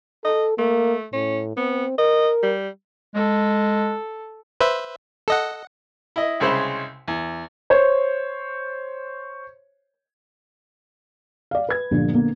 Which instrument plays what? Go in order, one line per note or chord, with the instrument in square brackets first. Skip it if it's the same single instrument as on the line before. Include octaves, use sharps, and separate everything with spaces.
[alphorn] A4 [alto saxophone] D#5
[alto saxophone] A3 [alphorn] A#3
[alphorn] A2 [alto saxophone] C#4
[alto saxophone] B3 [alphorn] C4
[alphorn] A#4 [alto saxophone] D#5
[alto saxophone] G3
[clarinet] G#3 [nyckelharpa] A4
[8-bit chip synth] B4 C5 E5
A4 D#5 F#5
[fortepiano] E4 D#5
C2 C#3 G#3 C5 E5 B5
E2
[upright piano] C5 C#5
[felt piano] D5 F5
B4 G#6
G1 G2 A#2 D3 F3
D3 A#3 B3